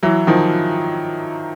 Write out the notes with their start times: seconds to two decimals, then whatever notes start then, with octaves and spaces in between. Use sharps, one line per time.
0.03 E3 F#3
0.27 D#3 F3